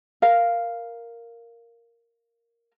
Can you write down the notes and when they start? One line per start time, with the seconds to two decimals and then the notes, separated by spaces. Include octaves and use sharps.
0.22 A#4 F5